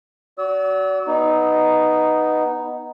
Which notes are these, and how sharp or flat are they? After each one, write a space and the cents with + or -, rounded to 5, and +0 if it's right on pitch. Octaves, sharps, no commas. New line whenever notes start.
F#4 +15 D5 -40 E6 -30
B3 +0 D#4 +0